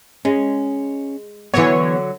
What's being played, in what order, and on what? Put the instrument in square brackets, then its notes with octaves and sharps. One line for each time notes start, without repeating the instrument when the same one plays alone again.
[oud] G#3 [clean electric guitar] C#4
[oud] D3 F#3 [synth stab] E3 C#5 [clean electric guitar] B3